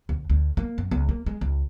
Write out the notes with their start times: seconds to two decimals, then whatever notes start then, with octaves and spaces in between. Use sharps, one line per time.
0.09 D2
0.30 D2
0.57 A#3
0.78 F#2
0.91 C#2
1.09 A#3
1.26 G#3
1.41 C#2